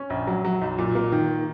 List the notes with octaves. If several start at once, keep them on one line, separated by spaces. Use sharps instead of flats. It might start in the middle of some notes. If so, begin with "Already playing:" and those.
Already playing: C#4
A#1
F#3
F#3
B1
A#2
A#3
D#3